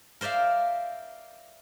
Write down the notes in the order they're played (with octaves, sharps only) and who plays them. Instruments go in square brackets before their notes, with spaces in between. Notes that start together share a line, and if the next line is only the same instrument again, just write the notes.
[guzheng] A#4 C5 D5 E5 F5